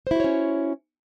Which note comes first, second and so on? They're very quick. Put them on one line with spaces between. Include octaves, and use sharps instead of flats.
C5 E4 F#4 C#5 C#4